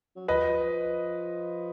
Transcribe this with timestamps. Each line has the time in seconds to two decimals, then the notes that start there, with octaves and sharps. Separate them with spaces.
0.16 F#3
0.28 F3 B4 D#5